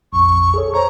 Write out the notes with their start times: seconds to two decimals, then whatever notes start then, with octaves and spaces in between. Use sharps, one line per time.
0.13 A#1 F2 C#6
0.54 G#4 A4 C#5
0.74 C5 C#5 A#5 C#6